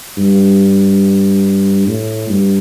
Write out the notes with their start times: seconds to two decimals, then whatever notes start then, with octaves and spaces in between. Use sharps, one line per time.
0.17 G2
1.87 A2
2.29 G2